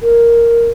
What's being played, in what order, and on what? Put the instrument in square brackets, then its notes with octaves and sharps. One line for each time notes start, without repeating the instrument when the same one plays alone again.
[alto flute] A#4